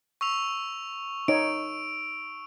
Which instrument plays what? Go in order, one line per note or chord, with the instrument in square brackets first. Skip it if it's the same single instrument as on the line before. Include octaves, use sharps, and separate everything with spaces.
[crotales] C#6 E6 F7
[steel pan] D#4 C#5 [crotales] D7